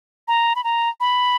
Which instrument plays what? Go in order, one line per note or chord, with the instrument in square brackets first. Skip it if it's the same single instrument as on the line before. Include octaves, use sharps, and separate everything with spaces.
[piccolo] A#5
B5
A#5
B5